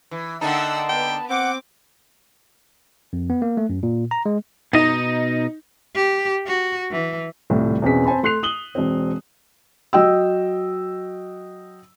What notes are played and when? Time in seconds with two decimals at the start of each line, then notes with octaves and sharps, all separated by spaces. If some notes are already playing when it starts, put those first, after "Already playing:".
0.11 E3
0.41 D3 A#3 D#4 F#5 G5 A5 E6
0.89 B3 G5
1.30 C4 F#5 D6
3.13 F2
3.30 B3
3.42 A#3
3.57 A3
3.70 F#2
3.83 A#2
4.11 A#5
4.26 G#3
4.73 B2 D#4 D#5 A#5
5.95 G4
6.47 F#4
6.91 E3
7.50 D#1 C2 A2 A3
7.82 E2 B2 C4 C#4 G#4 B6
8.05 C4 C5 G#5 A5 B5
8.23 A3 C6 F#6 C7 F7
8.43 D#6 F#7 G7
8.75 E1 C4
9.93 F#3 D#5 G5 E6